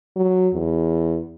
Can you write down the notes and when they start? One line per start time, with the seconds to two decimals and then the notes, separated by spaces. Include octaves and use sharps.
0.16 F#3
0.54 E2